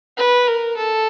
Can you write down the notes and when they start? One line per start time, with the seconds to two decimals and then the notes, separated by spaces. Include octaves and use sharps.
0.18 B4
0.47 A#4
0.77 A4